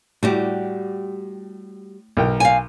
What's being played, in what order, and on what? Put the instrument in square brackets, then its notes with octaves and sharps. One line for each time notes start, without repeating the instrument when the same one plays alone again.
[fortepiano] A2 [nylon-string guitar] G3 F#4 G4
[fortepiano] B1 A#4 G5
[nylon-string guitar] F5 G#5